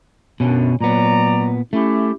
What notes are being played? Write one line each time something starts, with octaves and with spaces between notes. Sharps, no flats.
F#2 B2 C#4 D4
A#2 F#3 B3 D5 A#5
A3 C#4 E4 G4